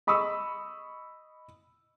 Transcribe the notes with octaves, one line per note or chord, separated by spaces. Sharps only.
D#5 B5 C#6 D#6 E6